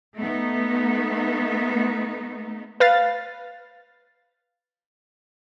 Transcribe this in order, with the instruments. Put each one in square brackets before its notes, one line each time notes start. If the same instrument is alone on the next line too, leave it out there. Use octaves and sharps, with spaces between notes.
[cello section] A3 B3 D#4
[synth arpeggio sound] B4 F5 A6